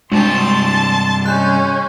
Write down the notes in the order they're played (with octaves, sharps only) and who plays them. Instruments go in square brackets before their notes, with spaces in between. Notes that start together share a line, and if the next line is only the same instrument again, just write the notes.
[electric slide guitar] G2 C3 C5 [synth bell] G#3 D4 [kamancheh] A5 C6
[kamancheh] G#3 C#4 [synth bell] F#6 G6